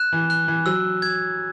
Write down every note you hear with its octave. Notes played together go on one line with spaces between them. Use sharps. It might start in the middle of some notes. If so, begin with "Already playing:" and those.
Already playing: F#6 E7
E3
F#6
E3
F#3 E6
G#6